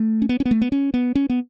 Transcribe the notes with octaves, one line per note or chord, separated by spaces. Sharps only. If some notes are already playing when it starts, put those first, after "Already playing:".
Already playing: A3
C#4
B3
C#4
B3
A3
B3
C#4
B3
C#4
B3